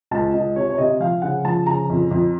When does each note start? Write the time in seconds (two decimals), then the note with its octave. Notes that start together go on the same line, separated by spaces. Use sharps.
0.11 C#2 A5
0.34 C#2 D#5
0.56 C3 C#5
0.69 C#5
0.78 C3 D#5
1.00 F3 F5
1.22 C#3 F#5
1.44 F3 A5
1.66 C#3 A#5
1.90 F2
2.11 F2